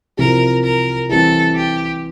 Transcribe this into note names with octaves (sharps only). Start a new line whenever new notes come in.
C3 F3 C4 E4 G4 A#4
A#4
E3 G3 C4 A4
G4